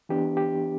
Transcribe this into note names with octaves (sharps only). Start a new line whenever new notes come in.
E3 B3 D4 G4
G4